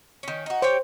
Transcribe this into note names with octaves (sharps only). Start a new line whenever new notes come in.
D#3 C#4
D#4 F#4
G4 C5 C#5 G5